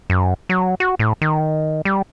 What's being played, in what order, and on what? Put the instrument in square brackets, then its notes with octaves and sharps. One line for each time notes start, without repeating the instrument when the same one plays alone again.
[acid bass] F#2
F#3
F#4
A2
D#3
G3